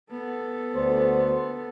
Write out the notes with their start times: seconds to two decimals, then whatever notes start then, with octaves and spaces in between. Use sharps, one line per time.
0.11 B3 A4
0.74 D2 C5